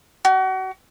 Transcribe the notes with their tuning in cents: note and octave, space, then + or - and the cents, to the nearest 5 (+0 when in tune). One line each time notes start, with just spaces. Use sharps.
F#4 +35